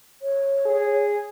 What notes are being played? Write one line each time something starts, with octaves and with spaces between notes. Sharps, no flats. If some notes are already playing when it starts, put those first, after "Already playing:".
C#5
G#4